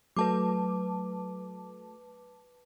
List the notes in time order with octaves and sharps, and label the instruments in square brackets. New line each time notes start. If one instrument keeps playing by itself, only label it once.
[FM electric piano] F#3 A3 [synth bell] B4 A5 D6